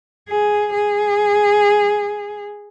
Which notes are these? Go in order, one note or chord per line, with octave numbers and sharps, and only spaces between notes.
G#4
G#4